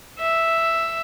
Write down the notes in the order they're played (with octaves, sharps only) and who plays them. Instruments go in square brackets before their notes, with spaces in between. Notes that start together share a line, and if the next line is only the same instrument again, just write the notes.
[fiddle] E5